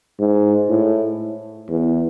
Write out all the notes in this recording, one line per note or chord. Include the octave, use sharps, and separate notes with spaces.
G#2
A2
E2